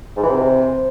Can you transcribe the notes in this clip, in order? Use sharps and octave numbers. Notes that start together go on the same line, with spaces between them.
G#2
E3
C3